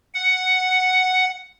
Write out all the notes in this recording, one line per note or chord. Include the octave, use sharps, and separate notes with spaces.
F#5